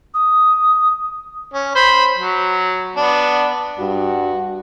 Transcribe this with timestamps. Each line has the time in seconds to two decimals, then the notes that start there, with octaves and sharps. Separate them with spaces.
0.14 D#6
1.54 C#4
1.76 C5 B5
2.18 F#3
2.97 B3 D4
3.79 G2 F#4